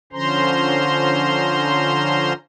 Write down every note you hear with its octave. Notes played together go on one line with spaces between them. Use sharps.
D3 F3 C#4 C5 A#5 C6